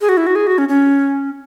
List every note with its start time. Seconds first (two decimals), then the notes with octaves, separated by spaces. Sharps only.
0.01 G#4
0.09 F#4
0.17 E4
0.27 F#4
0.35 G#4
0.47 F#4
0.58 C#4
0.69 C#4